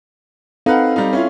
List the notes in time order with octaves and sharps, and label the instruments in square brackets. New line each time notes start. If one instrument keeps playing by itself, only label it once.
[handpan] C4 A4 F5 [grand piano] D#4 B4 F#5
[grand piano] G3 D#4
C#4 E4 F4